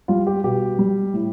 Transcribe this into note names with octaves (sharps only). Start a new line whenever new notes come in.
G3 F4
G4
B2 G4
G3
A2